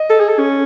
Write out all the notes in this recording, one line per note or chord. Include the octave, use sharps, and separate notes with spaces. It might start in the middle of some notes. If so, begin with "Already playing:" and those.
Already playing: D#5
A4
G#4
A4
C#4